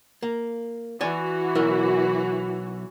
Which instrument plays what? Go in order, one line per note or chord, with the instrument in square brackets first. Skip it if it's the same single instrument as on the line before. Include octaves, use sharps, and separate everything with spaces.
[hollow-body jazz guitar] A#3
[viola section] E3 F#4 [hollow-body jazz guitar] D5 G#5
[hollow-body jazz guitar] B1 E4 A#4